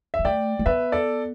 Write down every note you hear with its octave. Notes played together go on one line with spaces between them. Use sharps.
E5
B3
A3 D5 G5
A3
B3 B4 E5
A4 D5